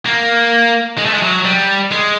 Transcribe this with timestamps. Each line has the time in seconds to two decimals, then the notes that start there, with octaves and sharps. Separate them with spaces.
0.06 A#3
0.98 G#3
1.05 A3
1.14 G#3
1.22 F#3
1.45 G3
1.92 G#3